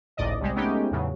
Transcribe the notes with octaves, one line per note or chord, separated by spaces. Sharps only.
G#1 C#2 A2 D5 D#5
C2 C3 G3 G#3
G#3 A3 B3 C#4 D#4 G4
E2 A2 C#3 F#3